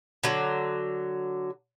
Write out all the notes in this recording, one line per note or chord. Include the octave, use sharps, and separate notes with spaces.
D3 F#3